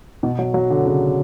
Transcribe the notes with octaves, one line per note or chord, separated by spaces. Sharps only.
B2
F#3
F#3
D3
C#3